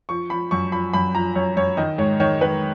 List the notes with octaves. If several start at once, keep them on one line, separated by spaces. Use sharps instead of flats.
F3 C#6
F3 B5
F#2 C#6
F3 B5
F#2 B5
F3 A#5
F#2 C#5
F#2 C#5
D#3 D#5
G#2 C#5
D#3 C#5
D#3 B4